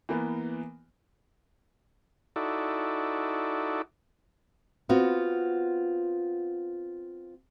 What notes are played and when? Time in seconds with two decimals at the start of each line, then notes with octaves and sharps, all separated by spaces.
0.09 E3 A#3 B3
2.36 D#4 E4 F#4 A4 D5
4.89 B3 C4 F4 F#4